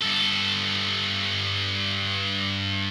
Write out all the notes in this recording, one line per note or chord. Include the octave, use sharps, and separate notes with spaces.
G2 A4